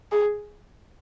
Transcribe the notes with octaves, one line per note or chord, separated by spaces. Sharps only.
G#4